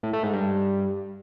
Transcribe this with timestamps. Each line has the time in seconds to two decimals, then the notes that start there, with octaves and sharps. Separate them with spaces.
0.03 A2
0.13 A3
0.23 G#2
0.33 G2